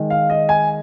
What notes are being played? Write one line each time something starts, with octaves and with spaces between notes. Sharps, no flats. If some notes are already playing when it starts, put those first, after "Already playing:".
Already playing: D#3 G#3
F5
D#5
G#5